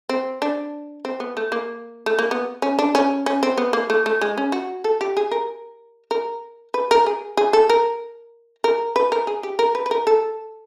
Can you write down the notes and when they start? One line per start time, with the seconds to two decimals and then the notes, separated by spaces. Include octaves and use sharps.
0.09 C4
0.42 D4
1.05 C4
1.20 B3
1.37 A3
1.52 A#3
2.06 A3
2.19 A#3
2.31 B3
2.62 C#4
2.79 D4
2.95 C#4
3.26 C#4
3.43 C4
3.58 B3
3.73 A#3
3.90 A3
4.06 A3
4.21 G#3
4.38 C#4
4.52 F#4
4.84 A4
5.01 G4
5.17 G#4
5.31 A#4
6.11 A#4
6.74 B4
6.91 A#4
7.06 G#4
7.37 G#4
7.53 A4
7.69 A#4
8.64 A#4
8.96 B4
9.12 A#4
9.27 G#4
9.43 G4
9.59 A#4
9.75 B4
9.86 B4
9.91 A#4
10.07 A4